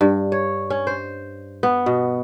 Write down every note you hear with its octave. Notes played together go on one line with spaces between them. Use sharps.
G2
C#5
C#4
C5
B3
B2